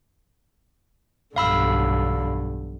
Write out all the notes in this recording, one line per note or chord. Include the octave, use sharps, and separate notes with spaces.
B1 E2 G2 D3 F5 B5 E6